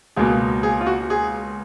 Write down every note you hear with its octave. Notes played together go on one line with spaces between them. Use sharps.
C#2 B2 A#3 G#4
G#4
F4
F#4
G#4